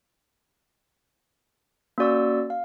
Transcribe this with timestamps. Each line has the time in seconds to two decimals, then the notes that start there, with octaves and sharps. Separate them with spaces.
1.98 A#3 C#4 F#4 D5 C#6 E6
2.50 F5